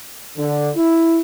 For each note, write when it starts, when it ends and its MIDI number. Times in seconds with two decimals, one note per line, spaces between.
0.37 0.70 50
0.76 1.20 64